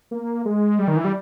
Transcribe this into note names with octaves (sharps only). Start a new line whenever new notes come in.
A#3
G#3
G3
D#3
E3
G3